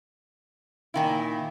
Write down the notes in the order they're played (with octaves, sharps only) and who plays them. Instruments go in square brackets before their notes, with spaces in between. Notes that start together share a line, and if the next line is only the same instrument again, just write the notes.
[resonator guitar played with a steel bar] A#2 D#3 E4 [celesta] F5 G5 G#5